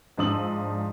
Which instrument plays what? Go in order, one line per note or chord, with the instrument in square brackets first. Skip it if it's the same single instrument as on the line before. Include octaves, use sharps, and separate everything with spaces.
[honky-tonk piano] G#2 F3 D4 D#6 E6 F#7